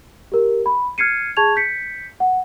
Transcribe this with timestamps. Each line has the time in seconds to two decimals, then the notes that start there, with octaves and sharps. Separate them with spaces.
0.32 G4 A#4
0.66 B5
0.98 F6 G#6 C7 C#7 D#7
1.37 G#4 A5 C#6 G#6 F7
1.56 G6 B6 C#7
2.20 F#5